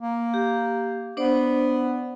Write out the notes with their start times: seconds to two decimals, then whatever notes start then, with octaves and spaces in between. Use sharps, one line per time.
0.02 A#3
0.34 G4
1.17 B3 D4 C5 D5